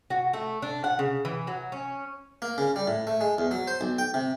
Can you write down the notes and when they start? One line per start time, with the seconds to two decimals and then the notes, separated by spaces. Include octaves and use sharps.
0.10 F#4
0.33 A3
0.62 D4
0.84 F#5
0.99 C#3
1.25 E3
1.47 F#3
1.72 C#4
2.42 A#3
2.58 C#3
2.76 G3
2.87 A2
3.07 A3
3.21 G#3
3.38 E2
3.51 F#3
3.67 C5
3.81 B1
3.98 G5
4.14 C3